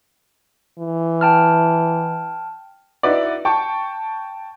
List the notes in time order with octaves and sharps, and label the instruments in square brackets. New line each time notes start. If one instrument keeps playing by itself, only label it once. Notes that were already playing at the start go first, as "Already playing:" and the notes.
[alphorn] E3
[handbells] G5 A5 F6
[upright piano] D#4 E4 F#4 B4 D5
G5 A5 C#6